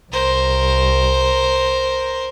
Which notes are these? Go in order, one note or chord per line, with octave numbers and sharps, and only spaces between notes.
C2 A#4 C5